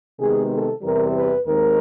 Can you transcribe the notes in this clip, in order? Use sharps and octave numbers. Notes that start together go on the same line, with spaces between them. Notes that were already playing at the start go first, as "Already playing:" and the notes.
C3 D#3 G#3 B3 G#4
A4
E2 C3 E3 G3 A#4
B4
D#2 D#3 G#3 C4 A#4